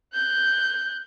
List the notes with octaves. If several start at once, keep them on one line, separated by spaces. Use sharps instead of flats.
F#6 G6